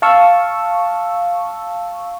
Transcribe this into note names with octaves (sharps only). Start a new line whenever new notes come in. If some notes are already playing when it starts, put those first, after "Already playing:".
F5 A5 C#6 E6